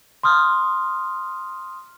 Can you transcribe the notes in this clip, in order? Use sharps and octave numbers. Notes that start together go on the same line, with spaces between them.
C6 D#6 F6